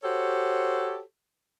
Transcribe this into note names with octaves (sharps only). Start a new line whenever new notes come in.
F#4 G4 A4 C5 C#5